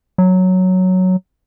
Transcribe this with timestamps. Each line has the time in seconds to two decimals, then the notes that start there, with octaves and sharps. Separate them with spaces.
0.18 F#3